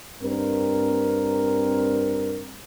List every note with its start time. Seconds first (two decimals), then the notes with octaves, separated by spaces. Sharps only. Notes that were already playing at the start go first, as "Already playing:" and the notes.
0.23 G2 C4 A#4